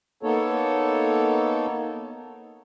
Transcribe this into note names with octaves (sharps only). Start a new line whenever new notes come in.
A#3 B3 D#4 A4 C#5